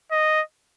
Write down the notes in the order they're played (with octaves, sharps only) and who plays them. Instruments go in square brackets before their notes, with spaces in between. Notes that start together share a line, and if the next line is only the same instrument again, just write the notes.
[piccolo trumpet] D#5